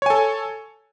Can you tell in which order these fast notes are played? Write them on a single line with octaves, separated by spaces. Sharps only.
C#5 G#5 A4